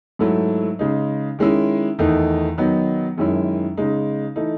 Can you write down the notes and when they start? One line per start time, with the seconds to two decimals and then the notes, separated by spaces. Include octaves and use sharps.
0.19 G#2 F#3 A3 E4
0.79 C#3 G#3 D#4
1.39 D#3 G#3 C#4 E4
1.99 E2 D#3 A3 D#4
2.58 D#3 F#3 B3 D#4
3.18 F#2 D#3 G#3 C#4 E4
3.77 C#3 G#3 D#4
4.36 E3 A3 D#4